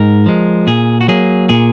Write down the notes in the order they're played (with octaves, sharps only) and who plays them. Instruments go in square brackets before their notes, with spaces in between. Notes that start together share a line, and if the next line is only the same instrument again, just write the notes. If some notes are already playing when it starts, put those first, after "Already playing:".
Already playing: [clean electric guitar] G#2 A#4
F3 G#3
A#2 G#4
F#4
F#3 A#3 G#4
A#2 G#4